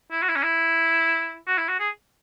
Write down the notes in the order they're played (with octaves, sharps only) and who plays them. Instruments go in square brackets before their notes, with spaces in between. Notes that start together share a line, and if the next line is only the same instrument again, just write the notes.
[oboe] E4
F#4
E4
C#4
E4
F#4
E4
F#4
G#4